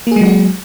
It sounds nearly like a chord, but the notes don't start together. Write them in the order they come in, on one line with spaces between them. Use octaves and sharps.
A#3 G#4 G#3 F#3 F#4